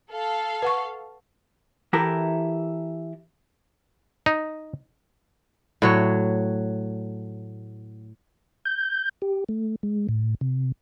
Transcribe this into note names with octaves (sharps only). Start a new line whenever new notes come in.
A4 F5
B4 F#5 C#6
E3 E4 G4 A4 A#4
D#4
A2 F#3 C#5
G6
G4
A3
G#3
A2
C3